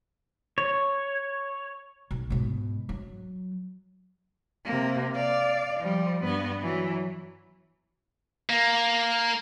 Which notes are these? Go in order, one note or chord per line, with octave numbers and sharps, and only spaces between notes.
C#5
B1
G#2 B2
F#3
C3 A#3
D5 F5
F3 G3
G2 B3
E3 F#3
A#3